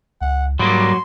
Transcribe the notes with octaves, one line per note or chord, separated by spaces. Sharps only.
C#2 F#5
G#2 F#3 G3 A#3 C6